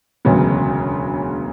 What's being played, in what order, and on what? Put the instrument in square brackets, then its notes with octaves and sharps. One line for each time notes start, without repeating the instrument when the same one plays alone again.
[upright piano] E1 D2 C#3 F#3 B3